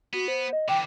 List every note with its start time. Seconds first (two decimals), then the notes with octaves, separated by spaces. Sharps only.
0.13 B3 F#4
0.28 C5
0.53 D#5
0.69 D3 E3 G5 D6